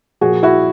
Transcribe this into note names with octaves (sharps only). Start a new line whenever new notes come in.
A#2 F3 F#4 G#4
E4 F#4